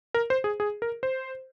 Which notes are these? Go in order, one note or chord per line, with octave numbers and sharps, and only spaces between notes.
A#4
C5
G#4
G#4
A#4
C5